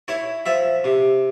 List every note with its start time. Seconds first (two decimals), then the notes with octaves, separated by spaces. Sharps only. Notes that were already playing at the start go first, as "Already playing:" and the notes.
0.08 E4 C#5
0.46 F3 E5
0.84 C3